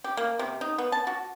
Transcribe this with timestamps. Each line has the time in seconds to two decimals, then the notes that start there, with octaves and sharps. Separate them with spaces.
0.04 G4
0.17 A#3
0.39 C3
0.61 D#4
0.78 B3
0.92 A5
1.07 F#4